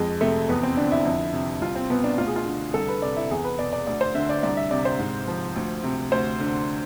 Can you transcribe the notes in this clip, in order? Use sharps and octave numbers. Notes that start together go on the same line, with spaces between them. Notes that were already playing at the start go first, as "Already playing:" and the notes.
Already playing: F2 G#3
C3 A3
E2 B3
C4
D3 D4
E4
F2
C3
C2 F4
C4
B2 B3
D4
D2 F4
G#4
F4
D3
C2 A4
B4
C3 D5
E4
E2 G#4
B4
B2 D5
D5
D2 D5
C5
D3 E5
D5
C2 D5
E5
C3 D5
C5
G#2
F3
D2
C3
D2 C5
D3